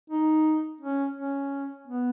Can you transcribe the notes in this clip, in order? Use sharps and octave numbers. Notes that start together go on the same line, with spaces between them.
D#4
C#4
C#4
B3